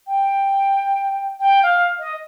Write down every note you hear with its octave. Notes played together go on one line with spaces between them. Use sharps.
G5
G5
F5
D#5